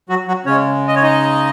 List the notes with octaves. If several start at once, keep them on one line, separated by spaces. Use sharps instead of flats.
F#3 F#4
F#3 F#4
C#3 G#3 C#4 C#5
D#5
C#5
D#4 D#5